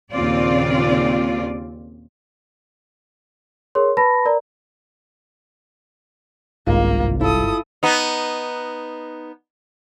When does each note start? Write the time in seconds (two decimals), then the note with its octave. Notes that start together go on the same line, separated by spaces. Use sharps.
0.13 D#2 A#2 C#3 C4 F4 D5
3.75 G#4 A#4 C#5 C6
3.97 B4 A5 B5 A#6
4.25 A#4 D5 A#5
6.67 G1 C2 G#2 A#3 F4
7.21 E4 F4 A4 D#6
7.83 B3 D#4